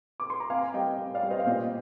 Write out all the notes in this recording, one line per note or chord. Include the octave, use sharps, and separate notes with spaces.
D6
C6
A#5
C4 F5 G#5
G3 D#5 G5
C4
D5 F5
G3
C5 D#5
F5
A#2 C5 D#5